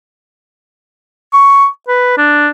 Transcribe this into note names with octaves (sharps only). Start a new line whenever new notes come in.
C#6
B4
D4